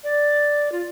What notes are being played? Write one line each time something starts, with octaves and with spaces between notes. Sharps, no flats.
D5
F4